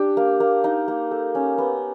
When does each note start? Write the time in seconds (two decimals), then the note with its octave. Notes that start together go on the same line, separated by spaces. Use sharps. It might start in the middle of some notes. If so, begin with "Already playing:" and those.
Already playing: D4 G4
0.17 A#3
0.40 A#3
0.64 D#4
0.88 A#3
1.11 A4
1.35 C#4
1.58 B3